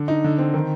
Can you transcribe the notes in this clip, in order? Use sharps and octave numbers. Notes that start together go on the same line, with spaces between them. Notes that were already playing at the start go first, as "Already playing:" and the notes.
Already playing: D3
D#4
D3
C4
D#3